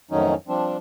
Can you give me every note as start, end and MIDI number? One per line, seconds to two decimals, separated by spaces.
0.11 0.35 41
0.11 0.35 45
0.11 0.35 51
0.11 0.35 54
0.11 0.35 61
0.11 0.35 63
0.48 0.77 53
0.48 0.77 55
0.48 0.77 60
0.48 0.77 62